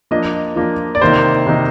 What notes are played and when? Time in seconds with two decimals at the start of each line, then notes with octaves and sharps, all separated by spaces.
0.11 F3 A#3 D4 D#5
0.56 F3 A#3 D4
0.95 D5
1.01 C3 D#3 A#3 D#4 C5
1.47 C3 D#3 A#3 D#4